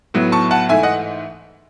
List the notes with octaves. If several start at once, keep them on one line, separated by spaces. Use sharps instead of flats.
A2 F#3 B3
A5 C#6
F#5 A5
G#2 E3 A3 E5 G#5
D#5 F#5